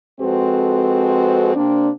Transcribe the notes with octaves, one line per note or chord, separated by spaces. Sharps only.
F2 G#3 C4 F#4 A4 B4
C3 A#3 C4 D4